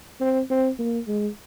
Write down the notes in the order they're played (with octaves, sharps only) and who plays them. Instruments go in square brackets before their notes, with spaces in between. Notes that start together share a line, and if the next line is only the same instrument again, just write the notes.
[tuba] C4
C4
A#3
G#3